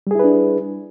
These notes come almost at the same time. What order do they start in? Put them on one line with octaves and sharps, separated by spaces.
G3 G#4 E4 B4 D4